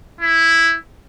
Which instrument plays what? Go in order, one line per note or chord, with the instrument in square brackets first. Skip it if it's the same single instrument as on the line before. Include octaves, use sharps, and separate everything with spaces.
[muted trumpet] E4